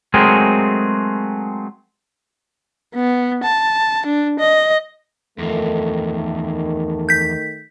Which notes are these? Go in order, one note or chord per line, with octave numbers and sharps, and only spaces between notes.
F#3 G#3 A3 C4 G#4 A#4
B3
A5
D4
D#5
E2 D#3 F3 A3
G6 B6